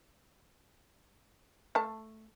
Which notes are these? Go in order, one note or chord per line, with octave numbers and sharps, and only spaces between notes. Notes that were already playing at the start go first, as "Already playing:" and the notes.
A3 A5